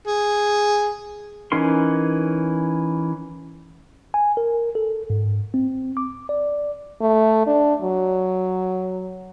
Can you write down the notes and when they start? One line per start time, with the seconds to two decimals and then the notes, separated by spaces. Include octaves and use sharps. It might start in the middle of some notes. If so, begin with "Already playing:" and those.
0.07 G#4
1.52 E3 C#4 D#4 A#4 C6
4.14 G#5
4.37 A#4
4.75 A4
5.10 G#2
5.54 C4
5.97 D6
6.29 D5
7.01 A3
7.47 D4
7.82 F#3